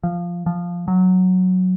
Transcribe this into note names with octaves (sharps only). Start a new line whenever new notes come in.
F3
F3
F#3